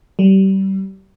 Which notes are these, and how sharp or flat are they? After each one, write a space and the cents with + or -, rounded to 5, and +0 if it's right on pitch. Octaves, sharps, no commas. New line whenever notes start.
G3 -30